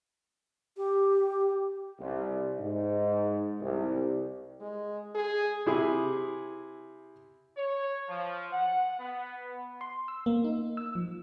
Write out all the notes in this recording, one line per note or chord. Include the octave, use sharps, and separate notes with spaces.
G4
C2
G#2
C2
G#3
G#4
C3 E4 G#4 B5
C#5
F3
F#5
B3
C6
E6
A#3
D#4
E6
F3